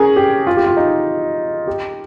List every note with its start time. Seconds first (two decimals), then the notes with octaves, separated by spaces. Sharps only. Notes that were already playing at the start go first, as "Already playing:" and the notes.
Already playing: C#4 G#4 A#4
0.16 G4
0.47 F4
0.57 G4
0.66 F4
0.77 D#4
1.67 G4